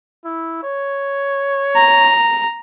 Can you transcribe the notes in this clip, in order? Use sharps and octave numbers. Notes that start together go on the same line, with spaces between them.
E4
C#5
A#5